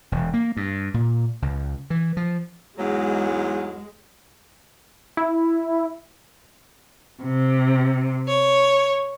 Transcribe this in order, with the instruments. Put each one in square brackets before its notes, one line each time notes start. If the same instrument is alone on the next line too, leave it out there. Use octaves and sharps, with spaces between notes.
[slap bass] E1
A#3
G2
A#2
C#2
E3
F3
[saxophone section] E2 G#2 F#3 [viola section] G#3
[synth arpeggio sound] E4
[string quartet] C3
C#5